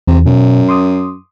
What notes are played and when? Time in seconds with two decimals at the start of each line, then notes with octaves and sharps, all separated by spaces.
0.07 E2 C3
0.26 F#2 B2
0.69 C6 D6 D#6